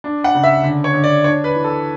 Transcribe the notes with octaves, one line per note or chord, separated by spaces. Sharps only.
D4
F#5
C#3
E5
D3
C#5
D3
D5
D4 C#5
B4
E3
A4